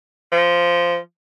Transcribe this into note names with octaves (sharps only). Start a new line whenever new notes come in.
F3